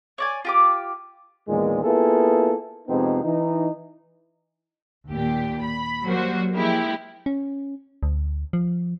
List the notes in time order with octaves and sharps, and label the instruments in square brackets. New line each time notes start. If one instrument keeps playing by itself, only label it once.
[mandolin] C#5 D5 G#5
F4 G4 D6
[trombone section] A#1 E2 A#2 D#3 G#3
A#3 B3 E4 F4 G#4 A4
F2 C3 G#3 B3 C4 D#4
E3 D#4
[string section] D#2 A#2 G4
B5
F#3 G3 A#3 F#4 C5
F3 G#3 A#3 E4 G4
[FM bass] C#4
D2
F3